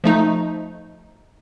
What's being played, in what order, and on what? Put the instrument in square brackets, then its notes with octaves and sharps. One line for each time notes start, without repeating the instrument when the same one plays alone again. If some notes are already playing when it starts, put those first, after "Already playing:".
[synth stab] F3 A3 D#4